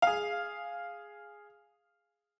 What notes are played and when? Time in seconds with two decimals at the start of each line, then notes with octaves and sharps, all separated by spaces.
0.02 G#4 F5